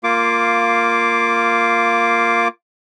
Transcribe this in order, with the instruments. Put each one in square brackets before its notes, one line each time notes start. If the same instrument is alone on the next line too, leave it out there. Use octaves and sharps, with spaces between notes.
[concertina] A#3 F4 D6